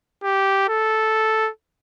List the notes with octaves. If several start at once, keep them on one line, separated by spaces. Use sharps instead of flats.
G4
A4